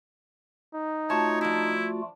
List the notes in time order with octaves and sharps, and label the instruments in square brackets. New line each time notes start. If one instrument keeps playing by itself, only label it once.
[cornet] D#4
[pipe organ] A3 F4 F#4 [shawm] C#5 [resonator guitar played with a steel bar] A5
[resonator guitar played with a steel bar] F3 D4 [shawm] E4